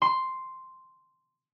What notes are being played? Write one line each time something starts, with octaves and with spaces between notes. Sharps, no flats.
C6